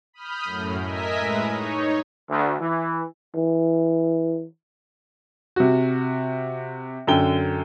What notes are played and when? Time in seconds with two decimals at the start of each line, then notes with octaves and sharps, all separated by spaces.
0.13 B5 D#6 F6 G6
0.44 F#2 A2
0.84 A#4 D#5 E5 G#5 B6
1.18 A2 G#3 B4 A#5 D#6
1.51 D#4 C#5
2.29 D2
2.59 E3
3.36 E3
5.56 C3 F#4
7.07 F#2 D3 G5 G7